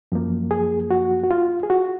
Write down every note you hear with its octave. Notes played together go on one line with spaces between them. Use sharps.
F#2 F3 A#3
G#4
F#4
F#4
F4
G#4
F#4